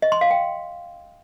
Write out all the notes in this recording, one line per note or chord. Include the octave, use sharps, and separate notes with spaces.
D#5
C6
F5
G5